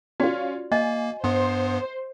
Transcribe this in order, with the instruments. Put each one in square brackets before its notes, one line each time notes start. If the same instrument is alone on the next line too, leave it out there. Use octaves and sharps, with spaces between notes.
[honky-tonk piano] C#4 F4 [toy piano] F#4 D5
[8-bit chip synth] A#3 [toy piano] D#5 [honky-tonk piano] G#5
[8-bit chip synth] G2 B3 [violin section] C5 [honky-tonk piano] C6